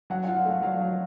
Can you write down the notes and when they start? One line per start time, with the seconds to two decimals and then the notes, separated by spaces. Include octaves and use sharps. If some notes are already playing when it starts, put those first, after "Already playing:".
0.10 F#3 F#5
0.24 F#5
0.28 F4
0.37 F5
0.45 A3 F#5
0.62 F#3 F5
0.80 F#3